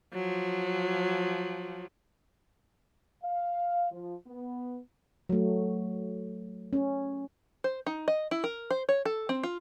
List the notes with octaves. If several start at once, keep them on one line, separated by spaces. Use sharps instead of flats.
F3 F#3
F5
F3
B3
F#3 A3
C#4
C5
D#4
D#5
E4
A#4
C5
C#5
A4
C4
F4